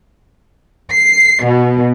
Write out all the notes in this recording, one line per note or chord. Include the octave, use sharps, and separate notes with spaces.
C7
B2